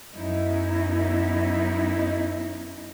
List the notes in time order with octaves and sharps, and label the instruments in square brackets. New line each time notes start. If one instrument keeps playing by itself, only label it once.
[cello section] F#2 B3 C#4 D#4 E4